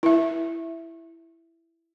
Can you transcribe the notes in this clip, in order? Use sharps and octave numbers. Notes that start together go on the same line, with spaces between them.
E4 E5